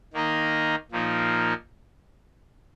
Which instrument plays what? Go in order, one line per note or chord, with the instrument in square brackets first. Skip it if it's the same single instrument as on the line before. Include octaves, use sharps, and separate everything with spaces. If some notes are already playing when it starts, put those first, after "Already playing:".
[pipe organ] D#3 A#3 D#4 A#4 D#5
A#2 F3 A#3 D#4 A#4